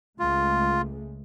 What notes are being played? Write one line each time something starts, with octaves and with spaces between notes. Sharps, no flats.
C#2 G#3 A3 F4